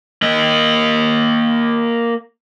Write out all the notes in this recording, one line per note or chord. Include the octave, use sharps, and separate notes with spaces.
A#3 D#5